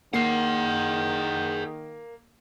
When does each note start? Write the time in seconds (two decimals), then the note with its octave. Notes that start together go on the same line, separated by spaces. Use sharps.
0.13 D#3 A#3 G#4 F#5 C7